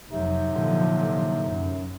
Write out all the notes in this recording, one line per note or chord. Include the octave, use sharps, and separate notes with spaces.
F1 C3 F#3 D#4
A#2 D3 F3
F#2